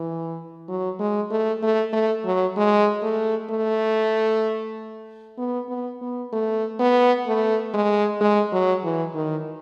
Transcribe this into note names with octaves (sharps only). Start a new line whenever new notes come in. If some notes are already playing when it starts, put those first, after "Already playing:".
Already playing: E3
F#3
G#3
A3
A3
A3
F#3
G#3
A3
A3
B3
B3
B3
A3
B3
A3
G#3
G#3
F#3
E3
D#3